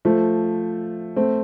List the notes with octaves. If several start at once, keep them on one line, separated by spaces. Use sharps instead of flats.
F3 A3
A3 C4